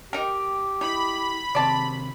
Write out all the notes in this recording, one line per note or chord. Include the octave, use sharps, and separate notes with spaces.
D#4 G4 A#4 G5
D#4 E4 B5
C3 D#3 C4 D5 A5